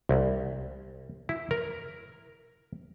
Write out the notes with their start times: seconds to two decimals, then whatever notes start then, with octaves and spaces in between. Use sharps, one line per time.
0.09 C2
1.29 E4
1.51 A#4